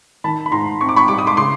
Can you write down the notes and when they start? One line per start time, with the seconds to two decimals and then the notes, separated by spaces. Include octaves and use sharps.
0.24 D#3 A5 B5
0.46 B5
0.52 G#2 A#5 C6
0.81 C4 C#6
0.89 D6
0.96 B5 C#6
1.08 G3 D6
1.19 D#6
1.27 C6 D6
1.37 C#3 C6 D6